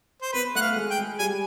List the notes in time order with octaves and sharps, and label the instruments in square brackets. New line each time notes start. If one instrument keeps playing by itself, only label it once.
[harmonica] C5
[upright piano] B3 [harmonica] B4
[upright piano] A3 [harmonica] F#5
[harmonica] F5
[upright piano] G#3
[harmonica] G5
[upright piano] G#3
[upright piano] G3 [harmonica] G#5